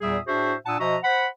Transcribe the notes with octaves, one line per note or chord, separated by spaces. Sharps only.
E2 A#2 G3 G#4 E5 D#6
A2 D4 F#4 G#4 C5 E5
A#2 D4 F#5 A5 D#6 E6
B2 F3 F#4 D#5 E5 A#5
C5 F#5 B5